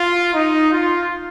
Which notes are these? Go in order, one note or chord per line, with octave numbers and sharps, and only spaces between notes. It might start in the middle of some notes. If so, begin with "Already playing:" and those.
Already playing: F4
D#4
F4